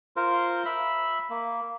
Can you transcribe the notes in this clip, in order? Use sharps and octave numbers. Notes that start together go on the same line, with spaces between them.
F4 A#4 C5
E5 B5
A#3